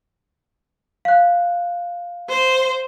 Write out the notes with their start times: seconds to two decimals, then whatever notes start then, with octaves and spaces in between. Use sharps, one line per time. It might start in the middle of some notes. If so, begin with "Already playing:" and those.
1.05 F5 F#6
2.29 C5